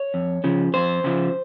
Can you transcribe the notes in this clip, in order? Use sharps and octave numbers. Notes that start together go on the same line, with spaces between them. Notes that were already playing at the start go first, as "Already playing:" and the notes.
Already playing: C#5
F2
C#3 F3
F2 C5
C#3 F3